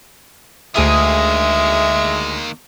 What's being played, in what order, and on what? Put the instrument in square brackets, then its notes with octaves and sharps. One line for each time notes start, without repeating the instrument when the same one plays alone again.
[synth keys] D2 G#4 D#6 [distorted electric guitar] D#3 A#3 [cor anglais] G#3 [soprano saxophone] E5